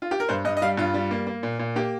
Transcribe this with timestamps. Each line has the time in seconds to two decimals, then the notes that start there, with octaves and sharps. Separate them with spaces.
0.02 F4
0.11 G4
0.20 A#4
0.29 G2 C5
0.45 G2 D#5
0.57 D#5
0.62 G3 F5
0.77 G2 F4
0.94 G3
1.11 A#3
1.27 A#3
1.43 A#2
1.59 A#2
1.76 A#3 G4